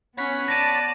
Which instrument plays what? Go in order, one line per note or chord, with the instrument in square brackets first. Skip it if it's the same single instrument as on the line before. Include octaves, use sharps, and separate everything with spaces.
[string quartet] B3 [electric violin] C#4 B6 [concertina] C#5 F#5 B5
[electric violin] D5 A5 [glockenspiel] A#6 D#7